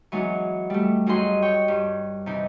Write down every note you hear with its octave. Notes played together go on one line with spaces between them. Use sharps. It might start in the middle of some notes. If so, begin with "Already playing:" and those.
E3 F#3 G#3 B3 D#4
G3 A3
F#2 D#4 F#4 G#4 D#5 C6
C#5 G5
G2
C3 E3 D#4